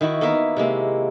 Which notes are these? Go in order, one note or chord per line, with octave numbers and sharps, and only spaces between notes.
D#3 E4 F#4
A#3 B3 A#4 E5
C3 G#3 A#3